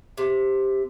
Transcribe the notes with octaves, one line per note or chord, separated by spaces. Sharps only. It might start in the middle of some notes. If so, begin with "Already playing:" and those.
C3